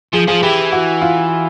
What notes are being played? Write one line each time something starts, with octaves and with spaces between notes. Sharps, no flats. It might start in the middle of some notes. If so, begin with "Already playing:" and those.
F3 G#4
F3 G#4
E3 G4
F#4
F4